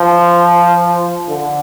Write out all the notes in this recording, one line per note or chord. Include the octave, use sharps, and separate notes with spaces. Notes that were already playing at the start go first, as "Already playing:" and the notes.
Already playing: F3
D3